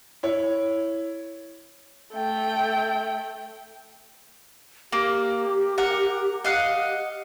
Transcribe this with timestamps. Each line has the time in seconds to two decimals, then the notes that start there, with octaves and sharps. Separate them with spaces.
0.23 E4 C#5
2.14 A3 G5
4.92 A#3 G4
5.78 A#4 F#5
6.44 D#5 F5 F#5